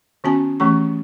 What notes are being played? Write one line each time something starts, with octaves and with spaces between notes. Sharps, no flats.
D#3 B3 C#4 F#4 G#5 A5
E3 A3 C#4 G4 C#6